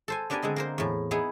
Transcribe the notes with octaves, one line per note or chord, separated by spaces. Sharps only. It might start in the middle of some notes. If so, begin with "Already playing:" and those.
A4 C5 G#5
B3 D4 G4 A#4 D5 G#5
D3 G#3 C4 D#5
A#3 A#4 C5
E2 A2
B3 D#4 E4 G#4